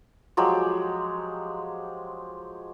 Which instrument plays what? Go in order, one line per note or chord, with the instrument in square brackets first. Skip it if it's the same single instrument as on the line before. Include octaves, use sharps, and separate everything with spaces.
[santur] F3 F#3 G#3 G4